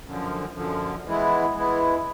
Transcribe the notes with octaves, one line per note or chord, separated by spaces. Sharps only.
F#2 D3 F3
F#2 D3 F3
E3 G#3 B3 E4
E3 G#3 B3 E4